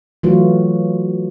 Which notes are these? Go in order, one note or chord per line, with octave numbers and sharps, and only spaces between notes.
E3 F#3 A3 F4 F#4 B4